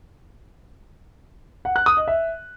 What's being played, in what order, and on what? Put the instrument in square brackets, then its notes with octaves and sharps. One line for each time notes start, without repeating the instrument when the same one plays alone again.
[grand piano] F#5
F#6
D#6
D#5
E5